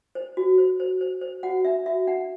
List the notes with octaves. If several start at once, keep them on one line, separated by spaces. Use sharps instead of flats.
C5
F#4
C5
C5
C5
C5
F#4 F#5
D4 E5
F#4 E5
D4 F#5